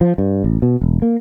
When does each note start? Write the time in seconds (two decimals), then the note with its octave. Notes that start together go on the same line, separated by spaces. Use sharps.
0.01 F3
0.18 G2
0.44 A1
0.62 B2
0.81 E1
1.02 A#3